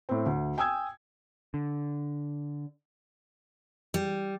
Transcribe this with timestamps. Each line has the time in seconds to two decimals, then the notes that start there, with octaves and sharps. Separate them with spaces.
0.09 A2 C4
0.26 D2
0.58 G5 G#5 D#6 E6 G#6
1.54 D3
3.94 G3